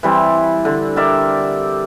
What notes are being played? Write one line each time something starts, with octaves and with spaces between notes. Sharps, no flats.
E3 G3 C4
D3
G4 A#4 D5 E5